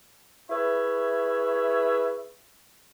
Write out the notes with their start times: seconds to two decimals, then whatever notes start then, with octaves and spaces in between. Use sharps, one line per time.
0.50 E4 G#4 B4 C#5 E5